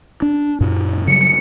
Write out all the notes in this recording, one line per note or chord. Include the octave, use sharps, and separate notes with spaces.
D4
F#2 A#2
C#3 F#3 G3 C#7